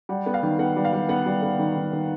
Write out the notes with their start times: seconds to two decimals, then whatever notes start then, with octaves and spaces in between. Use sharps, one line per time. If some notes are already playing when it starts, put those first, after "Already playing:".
0.09 G3 F#5
0.26 B3
0.34 F5
0.43 D#3
0.59 B3 F#5
0.76 G3
0.85 F5
0.93 G3
1.09 B3 F#5
1.26 G3
1.43 B3
1.59 D#3
1.76 D#3
1.93 D#3